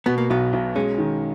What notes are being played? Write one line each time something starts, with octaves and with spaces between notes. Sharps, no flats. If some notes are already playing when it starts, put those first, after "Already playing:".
B2 B3
A#3
B1 B3
B1
G#3 C#4
D#3